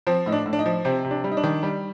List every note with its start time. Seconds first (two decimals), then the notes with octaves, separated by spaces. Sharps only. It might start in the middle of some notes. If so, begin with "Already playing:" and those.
0.07 F3 C4
0.26 A2 D#4
0.32 D4
0.46 A2
0.53 D4
0.59 D#4
0.66 F3
0.85 C3 C4
1.05 C3
1.11 D4
1.24 G3
1.32 D#4
1.37 D4
1.44 D#3
1.63 G3